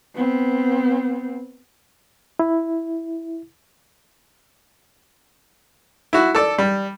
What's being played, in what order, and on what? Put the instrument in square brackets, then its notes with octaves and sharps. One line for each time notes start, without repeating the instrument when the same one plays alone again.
[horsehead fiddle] B3 C4
[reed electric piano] E4
[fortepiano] E4 F#4
A4 D5
G3